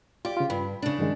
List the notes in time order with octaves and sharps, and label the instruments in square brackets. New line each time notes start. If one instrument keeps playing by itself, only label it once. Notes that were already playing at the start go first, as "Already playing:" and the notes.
[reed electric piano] F4 D5 [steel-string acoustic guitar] G4
[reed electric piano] C#3 F4
[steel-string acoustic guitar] G2 [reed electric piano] B5
[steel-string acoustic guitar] C#3 D4
[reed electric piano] G2 D#3 G#3